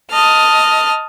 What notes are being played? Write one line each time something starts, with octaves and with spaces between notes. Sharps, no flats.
D#5 A5 F6